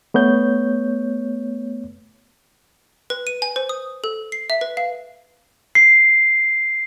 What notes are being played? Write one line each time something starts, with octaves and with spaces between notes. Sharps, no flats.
A3 B3 C#5 G6
B4
D#7
G#5
C5
D#6
A4
C7
E5
B4
F5
C7